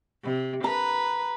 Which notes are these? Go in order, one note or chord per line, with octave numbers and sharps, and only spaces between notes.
C3
B4 A#5